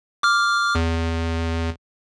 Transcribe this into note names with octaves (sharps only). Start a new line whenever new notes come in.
D6 F6
E2